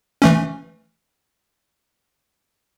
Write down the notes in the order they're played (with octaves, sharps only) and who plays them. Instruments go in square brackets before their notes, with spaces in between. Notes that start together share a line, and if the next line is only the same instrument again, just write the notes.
[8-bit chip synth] E3 A3 C#4